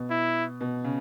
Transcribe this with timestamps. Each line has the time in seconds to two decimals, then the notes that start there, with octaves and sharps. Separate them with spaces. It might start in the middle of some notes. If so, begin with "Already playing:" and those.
Already playing: B2
0.10 E4
0.61 B2
0.84 C#3